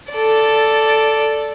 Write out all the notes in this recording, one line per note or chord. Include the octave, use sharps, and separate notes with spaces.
A4 D5